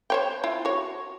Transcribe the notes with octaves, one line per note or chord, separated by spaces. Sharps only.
C5 C#5 G5
E4 F4
F#4 C#5